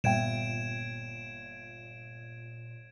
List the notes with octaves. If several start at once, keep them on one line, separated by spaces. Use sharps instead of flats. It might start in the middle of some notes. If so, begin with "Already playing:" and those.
G1 A#2 E5 G5 G#6 D7 E7